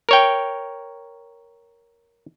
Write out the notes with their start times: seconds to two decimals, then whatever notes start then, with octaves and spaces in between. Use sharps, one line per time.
0.09 A#4 C#5 G5